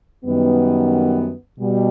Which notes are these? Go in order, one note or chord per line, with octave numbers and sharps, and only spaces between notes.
F#2 D#3 G3 B3
B2 G3